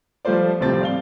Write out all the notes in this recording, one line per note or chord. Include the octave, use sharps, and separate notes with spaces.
F3 G3 A3 F4 C5 D5
D#1 A2 C3 F3 C4 A6
D5 F5 G7